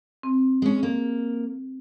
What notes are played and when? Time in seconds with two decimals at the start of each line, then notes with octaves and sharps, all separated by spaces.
0.23 C4
0.62 G#3 C#4
0.83 A#3